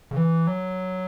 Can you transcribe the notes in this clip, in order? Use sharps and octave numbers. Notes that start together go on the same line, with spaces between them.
C#3
E3
F#3